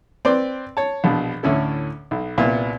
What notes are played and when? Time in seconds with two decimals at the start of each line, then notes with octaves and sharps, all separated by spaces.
0.25 C4 B4 D5 C6 D6
0.77 C#5 A5
1.04 A#1 B2
1.43 D2 A2 C#4 E4 A4
2.11 B1
2.38 C2 A#2 B3 E5